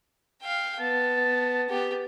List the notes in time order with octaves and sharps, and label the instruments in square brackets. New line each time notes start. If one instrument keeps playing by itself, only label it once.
[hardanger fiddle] F5 G5
[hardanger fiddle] B3 [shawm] A5
[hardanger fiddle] B3 G4